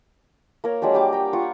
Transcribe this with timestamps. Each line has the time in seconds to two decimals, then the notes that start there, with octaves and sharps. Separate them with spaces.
0.64 A#3 A#4 C#5
0.82 F#3 G#3 D4 G4
0.94 G3 G4 D6
1.13 G5 A#5
1.33 F4 F#5 C#6